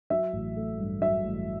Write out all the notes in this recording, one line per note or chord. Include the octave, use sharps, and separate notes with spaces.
F#3 E5
A1
A3
G2
F#3 E5
A1